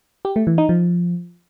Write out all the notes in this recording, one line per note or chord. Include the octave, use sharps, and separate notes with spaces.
G4
A3
E3
D#4
F3